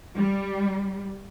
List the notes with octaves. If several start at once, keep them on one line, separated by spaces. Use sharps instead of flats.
G3